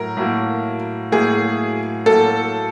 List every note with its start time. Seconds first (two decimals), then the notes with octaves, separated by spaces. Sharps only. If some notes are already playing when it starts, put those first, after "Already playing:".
Already playing: A2 F#3 A#4
0.17 A2 F#3 A#3
1.12 A2 F#3 A#3 G#4
2.06 A2 F#3 A#3 A4